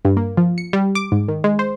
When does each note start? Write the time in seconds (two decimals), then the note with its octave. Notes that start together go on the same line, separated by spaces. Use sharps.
0.05 G2
0.17 A#3
0.37 F3
0.58 C#7
0.73 G3
0.95 D6
1.12 G#2
1.28 D#3
1.44 G#3
1.59 C5